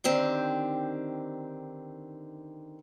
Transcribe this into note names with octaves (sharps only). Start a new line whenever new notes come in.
D3 D#3 C4 G4